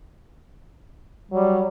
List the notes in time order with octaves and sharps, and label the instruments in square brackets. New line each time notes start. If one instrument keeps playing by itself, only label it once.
[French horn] F#3 [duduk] G3